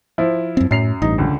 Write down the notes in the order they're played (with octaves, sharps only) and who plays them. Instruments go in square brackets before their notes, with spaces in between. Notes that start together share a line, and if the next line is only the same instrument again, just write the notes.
[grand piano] F3 E4 F4
[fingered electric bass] F#2 C4
[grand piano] F#2 C7 F7 [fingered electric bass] A2
[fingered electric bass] A1 G2 [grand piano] D#4
[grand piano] C#2 D3